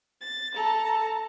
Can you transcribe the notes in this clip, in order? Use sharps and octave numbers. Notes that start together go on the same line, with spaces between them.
A6
A4 A5 A#5